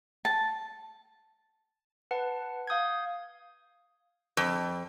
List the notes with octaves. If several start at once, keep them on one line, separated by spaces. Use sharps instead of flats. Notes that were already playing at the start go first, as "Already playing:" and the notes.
A5
B4 F#5 A5
F5 D#6 G6 G#6
F2